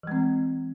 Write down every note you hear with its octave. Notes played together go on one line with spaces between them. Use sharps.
E3 G#3 C4